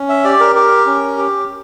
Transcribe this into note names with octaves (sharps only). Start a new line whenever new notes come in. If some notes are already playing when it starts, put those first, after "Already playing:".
Already playing: C#4
E5
G4 D5
A#4
G4 A#4
C#4
G4